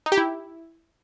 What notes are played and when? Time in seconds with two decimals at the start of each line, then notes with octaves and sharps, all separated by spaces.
0.06 D#4
0.12 G4
0.18 E4